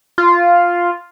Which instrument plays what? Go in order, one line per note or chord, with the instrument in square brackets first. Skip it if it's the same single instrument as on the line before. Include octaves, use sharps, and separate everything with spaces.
[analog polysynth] F4